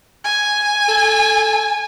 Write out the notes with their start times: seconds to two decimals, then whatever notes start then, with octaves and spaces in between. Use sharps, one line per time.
0.24 G#5
0.88 A4